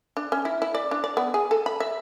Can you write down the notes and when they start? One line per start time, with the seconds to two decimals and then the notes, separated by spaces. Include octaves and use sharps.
0.17 D4
0.32 C#4
0.45 E4
0.62 E4
0.74 D5
0.91 D4
1.04 D5
1.17 B3
1.34 G#4
1.51 A4
1.66 B5
1.80 E5